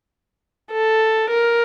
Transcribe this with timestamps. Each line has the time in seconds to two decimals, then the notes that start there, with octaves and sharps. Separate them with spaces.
0.72 A4
1.30 A#4